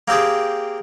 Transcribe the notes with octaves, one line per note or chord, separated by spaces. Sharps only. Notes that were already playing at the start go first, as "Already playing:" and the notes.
A#3 C4 G4 G#4